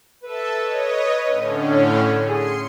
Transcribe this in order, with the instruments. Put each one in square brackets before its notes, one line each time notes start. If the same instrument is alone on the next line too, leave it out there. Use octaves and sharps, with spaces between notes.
[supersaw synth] A4 E5 A5 [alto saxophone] B4
[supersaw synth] C#5 D#5
A2 D3 C#4
[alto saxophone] G#4 [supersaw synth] C6 C#7